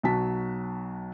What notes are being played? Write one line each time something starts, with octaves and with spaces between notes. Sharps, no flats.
B1 F#3 F#4 A5 B6